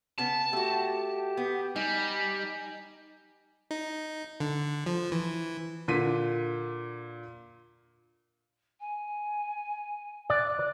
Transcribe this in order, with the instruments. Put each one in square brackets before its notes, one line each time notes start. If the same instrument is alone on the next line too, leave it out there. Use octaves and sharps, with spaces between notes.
[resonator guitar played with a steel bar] C#3 B3 [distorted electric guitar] A5
[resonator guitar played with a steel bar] A3 F#4 [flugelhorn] G4
[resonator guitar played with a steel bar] B3
[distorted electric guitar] G3 [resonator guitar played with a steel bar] D#4 [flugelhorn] G#5
[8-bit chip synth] D#4
D3
F3
E3
[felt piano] A#2 D3 B6 D#7
[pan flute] G#5
[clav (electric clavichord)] D5 [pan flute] F#6